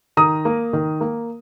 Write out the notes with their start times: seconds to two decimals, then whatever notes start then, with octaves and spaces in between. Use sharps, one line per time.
0.17 D#3 A#5 D#6
0.45 A#3
0.73 D#3
1.01 A#3